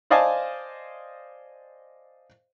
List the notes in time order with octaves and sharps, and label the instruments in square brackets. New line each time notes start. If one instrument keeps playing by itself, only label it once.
[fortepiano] C5 D5 D#5 F5 G#5 A5